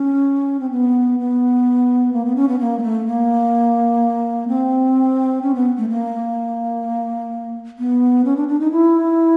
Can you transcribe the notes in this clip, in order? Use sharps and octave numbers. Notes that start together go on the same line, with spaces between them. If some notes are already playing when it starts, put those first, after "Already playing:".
Already playing: C#4
C4
B3
B3
A#3
B3
C#4
B3
A#3
G#3
A3
A#3
C4
C#4
B3
A3
A#3
B3
C#4
D4
D4
D#4
E4